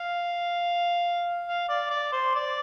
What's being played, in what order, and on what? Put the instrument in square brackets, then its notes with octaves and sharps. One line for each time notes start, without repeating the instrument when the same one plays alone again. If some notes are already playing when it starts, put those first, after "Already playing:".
Already playing: [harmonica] F5
F5
D5
D5
C5
D5